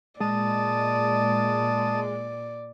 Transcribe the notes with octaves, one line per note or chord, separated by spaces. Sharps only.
A#2 G#3 D5 A5 D#6